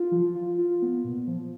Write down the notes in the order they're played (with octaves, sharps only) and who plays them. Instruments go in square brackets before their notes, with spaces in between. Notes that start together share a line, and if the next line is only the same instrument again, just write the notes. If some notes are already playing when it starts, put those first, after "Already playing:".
Already playing: [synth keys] F4
F3
F4
F4
B3
A#2
F3